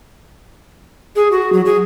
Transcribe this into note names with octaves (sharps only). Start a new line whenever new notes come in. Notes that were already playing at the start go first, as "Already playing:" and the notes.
G#4
F#4
F#3
G#4